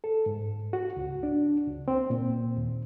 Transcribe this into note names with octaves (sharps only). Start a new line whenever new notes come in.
A4
G#2
F#4
C#2
D4
C#2
C4
A#2
D#2